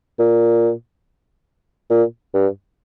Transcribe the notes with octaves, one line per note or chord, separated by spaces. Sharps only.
A#2
A#2
G2